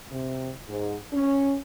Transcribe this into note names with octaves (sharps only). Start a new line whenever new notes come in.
C3
G#2
C#4